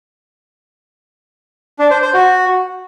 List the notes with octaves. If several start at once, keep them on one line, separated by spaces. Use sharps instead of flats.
D4
C5
C5
F#4